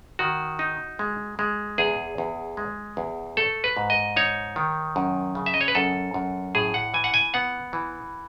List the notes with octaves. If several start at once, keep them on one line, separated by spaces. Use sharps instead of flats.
D#3 F#4
D#4
G#3
G#3
E2 G#4
E2
G#3
E2
A3 A4
B4
G#2
D#5
D#4 C#5
D#3
F#2
C#3
E5
D#5
C#5
B4
F#2 A4
F#2
A2 G#4
F#5
E3 G#5
F#5
G#5
B3 F#5
E3